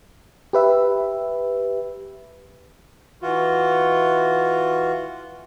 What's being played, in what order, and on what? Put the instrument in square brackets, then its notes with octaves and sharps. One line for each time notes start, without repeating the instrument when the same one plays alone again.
[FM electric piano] G4 B4 E5
[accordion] E3 F4 F#4